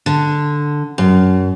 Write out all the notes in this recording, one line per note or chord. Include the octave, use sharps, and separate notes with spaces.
D3
F#2